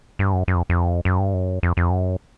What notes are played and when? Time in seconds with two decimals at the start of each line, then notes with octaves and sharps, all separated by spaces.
0.19 G2
0.33 F#2
0.48 F#2
0.55 F2
0.69 F2
1.05 F#2
1.19 G2
1.34 F#2
1.63 F2
1.77 F2
1.91 F#2